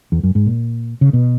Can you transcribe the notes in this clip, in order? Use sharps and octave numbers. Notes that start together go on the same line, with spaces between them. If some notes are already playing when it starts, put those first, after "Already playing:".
E2
F#2
G#2
A#2
C#3
B2